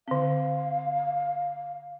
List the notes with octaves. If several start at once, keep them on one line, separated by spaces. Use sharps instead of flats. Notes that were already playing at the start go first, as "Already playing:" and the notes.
D3 C4 F5